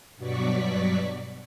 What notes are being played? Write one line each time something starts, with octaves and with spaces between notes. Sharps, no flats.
G2 B2 F#3 D5 C#6 B6